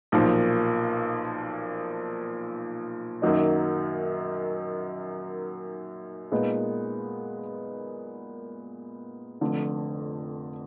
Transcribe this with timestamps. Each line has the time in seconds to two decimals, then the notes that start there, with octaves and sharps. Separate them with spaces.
0.12 B1 A#2 F3
3.22 F#2 D#3 F#3 A#3 D#4
6.32 A#2 G#3 B3 D#4
9.41 F1 F2 D3